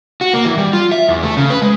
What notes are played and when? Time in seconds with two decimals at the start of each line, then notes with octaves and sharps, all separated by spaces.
0.21 F#4
0.34 A#3
0.45 E3
0.58 G3
0.73 F4
0.92 E5
1.09 E2
1.23 A3
1.37 C#3
1.50 B4
1.62 G#3